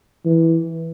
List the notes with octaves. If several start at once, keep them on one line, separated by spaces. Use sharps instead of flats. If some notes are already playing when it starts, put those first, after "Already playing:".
E3